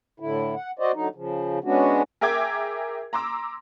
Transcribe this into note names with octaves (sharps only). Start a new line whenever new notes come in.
A2 D3 E4
F#5
F#4 C5 D5 D#5
D3 F#3 D#4
C#3 F3
G#3 B3 C#4 D4 F#4
G#4 A#4 E5 G5 D6 G#6
A#5 C6 D6 E6